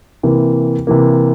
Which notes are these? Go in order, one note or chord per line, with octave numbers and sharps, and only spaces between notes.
C3 E3 A#3
C3 E3 A#3